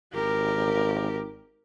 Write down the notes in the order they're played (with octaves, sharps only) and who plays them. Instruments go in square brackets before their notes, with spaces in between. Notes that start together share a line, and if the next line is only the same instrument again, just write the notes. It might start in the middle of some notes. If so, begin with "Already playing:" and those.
[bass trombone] G#1 [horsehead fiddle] G4 A#4